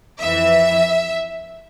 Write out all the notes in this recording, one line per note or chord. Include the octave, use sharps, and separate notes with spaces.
F2 E3 E5